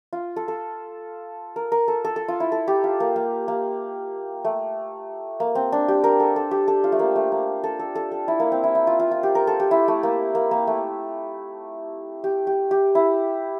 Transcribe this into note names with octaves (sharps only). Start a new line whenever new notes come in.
F4
A4
A4
A#4
A#4
A4
A4
A4
F4
E4
A4
G4
F4
A#3
A#3
A#3
A3
A#3
C4
D4
G4
A#4
A4
A4
G4
A4
F4
A3
A#3
A3
A#3
A4
A4
A4
A4
E4
A#3
C4
E4
E4
F4
F4
F4
G4
A#4
A4
G4
E4
A3
A#3
A#3
A#3
A3
G4
G4
G4
E4